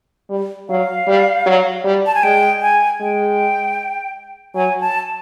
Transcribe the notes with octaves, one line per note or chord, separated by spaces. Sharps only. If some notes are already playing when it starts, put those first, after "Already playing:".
G3
F#3 F5
G3
F#3
G3
A5
G#5
G#3 G5
G#5
G#3 G5
F#3 G#5
A5